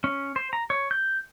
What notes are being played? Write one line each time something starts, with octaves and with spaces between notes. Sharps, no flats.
C#4
C5
A#5
C#5
G6